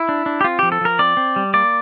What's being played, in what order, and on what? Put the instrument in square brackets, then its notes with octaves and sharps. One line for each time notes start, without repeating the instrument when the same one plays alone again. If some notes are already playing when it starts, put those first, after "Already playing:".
Already playing: [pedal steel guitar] E4
D4
D4
G4
C4 F4
F3 G4
A4
F3 A#4
C4 D5
C4
G3
A#3 D5